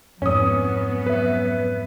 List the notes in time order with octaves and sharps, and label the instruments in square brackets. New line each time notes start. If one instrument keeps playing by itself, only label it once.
[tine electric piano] F2 G#2 [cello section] F#3 B3 [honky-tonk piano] C#4 D#6
[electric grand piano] B4 E5